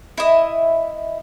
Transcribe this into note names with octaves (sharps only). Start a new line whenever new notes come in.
E4 D#5